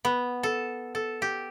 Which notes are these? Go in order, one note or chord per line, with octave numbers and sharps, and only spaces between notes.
B3
A4
A4
G4